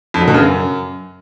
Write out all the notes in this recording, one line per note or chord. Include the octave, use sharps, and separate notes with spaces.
F2
F#3
B2
C#3
F#2